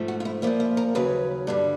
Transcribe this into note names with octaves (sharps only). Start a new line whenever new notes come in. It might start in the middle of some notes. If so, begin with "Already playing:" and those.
Already playing: G#2 F3 A3
F#4
F4
E4
A#2 F3 A#3 E4
E4
A#4
D#2 C#3 F#3 B4
G2 D3 G3